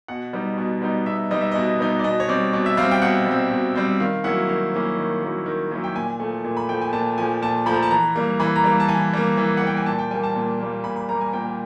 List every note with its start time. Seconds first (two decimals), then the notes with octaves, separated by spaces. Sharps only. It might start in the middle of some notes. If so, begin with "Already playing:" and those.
0.08 B2 F#5
0.33 G3 B3 D#4
0.58 B2
0.82 G3 B3 D#4
1.06 B2 E5
1.31 G3 B3 D#4 D#5
1.41 E5
1.52 B2 D#5
1.79 G3 B3 D#4
1.99 D5
2.04 B2 D#5
2.20 C#5
2.29 G3 C4 D5
2.53 B2 D5
2.66 E5
2.77 G3 C4 F5
2.91 G5
3.02 B2 F#5
3.26 G3 C4
3.51 B2
3.75 G3 C4
4.00 D#3 F5
4.24 F#3 A#3 C#4 E4 F#5
4.48 D#3 F5
4.73 F#3 A#3 C#4 E4
4.97 D#3
5.22 F#3 A#3 C#4 E4
5.46 D#3
5.71 F#3 A#3 C#4 E4
5.84 G5
5.95 A#2 G#5
6.20 F3 A3
6.44 A#2
6.57 B5
6.69 F3 A3 G5
6.81 G#5
6.93 A#2 A5
7.18 F3 A3 G#5
7.42 A#2 A5
7.66 F3 A3 B5
7.74 A#5
7.83 A5
7.91 E3 A#5
8.16 G3 A#3
8.40 E3 B5
8.56 A#5
8.64 G3 A#3
8.80 A5
8.88 E3 G#5
9.13 G3 A#3
9.37 E3
9.57 F#5
9.62 G3 A#3 G5
9.77 G#5
9.86 A#2 A5
9.99 G5
10.11 G3 A#3 G#5
10.24 A5
10.36 A#2
10.60 G3 A#3
10.84 A#2 B5
10.96 B5
11.09 G3 A#3 A#5
11.21 G#5
11.33 A#2 G5